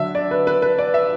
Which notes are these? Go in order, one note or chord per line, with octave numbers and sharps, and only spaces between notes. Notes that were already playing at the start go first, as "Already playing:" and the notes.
Already playing: D3 F#3 D4 E5
D5
B4
B4
B4
D5
E5